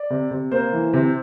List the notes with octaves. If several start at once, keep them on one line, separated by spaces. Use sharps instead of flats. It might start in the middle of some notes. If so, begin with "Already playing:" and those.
Already playing: D5
C3
C3
A#3 C5
E3
C3